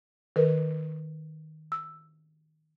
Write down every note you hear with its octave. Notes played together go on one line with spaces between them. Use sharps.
D#3 A#4 B4
E6